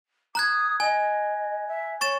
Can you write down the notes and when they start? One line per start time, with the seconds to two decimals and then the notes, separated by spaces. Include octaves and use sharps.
0.35 A#5 D#6 F#6 G#6
0.80 D#5 G#5
1.67 E5
2.01 C#5 C#6 A6 E7